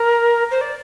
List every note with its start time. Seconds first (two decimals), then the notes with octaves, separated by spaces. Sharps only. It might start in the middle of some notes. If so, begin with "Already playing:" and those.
Already playing: A#4
0.50 C5
0.61 D5